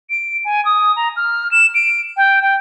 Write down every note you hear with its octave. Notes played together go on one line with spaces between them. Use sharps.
D7
G#5
D#6
A#5
F6
E7
D7
G5
G5